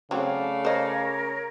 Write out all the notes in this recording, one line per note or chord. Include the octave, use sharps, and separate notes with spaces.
C#3 F#3 A3 C4 D5 F5
A#4 C5 C#5 D#5